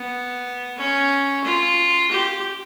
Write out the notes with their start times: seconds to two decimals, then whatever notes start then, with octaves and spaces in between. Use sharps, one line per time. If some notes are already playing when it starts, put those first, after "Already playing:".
Already playing: B3
0.78 C#4
1.45 F4
2.12 G4